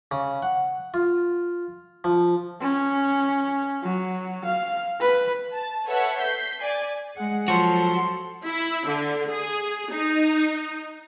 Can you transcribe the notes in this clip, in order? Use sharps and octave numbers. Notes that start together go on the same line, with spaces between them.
C#3
F#5
F4
F3
C#4
F#3
F5
B4
A5
A4 B4 C#5 E5 F#5
G6 B6 C7
D5 G#5
G#3 G#4 F#5
F3 F#3 F#4 A4 C6
E4
D3
G#4
D#4